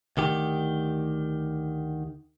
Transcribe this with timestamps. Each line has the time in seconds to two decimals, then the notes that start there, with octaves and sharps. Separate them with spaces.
0.17 D2 D#3 G4